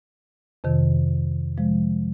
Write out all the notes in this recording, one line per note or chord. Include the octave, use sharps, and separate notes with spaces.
F2 C3 D#3
C3 F3 G#3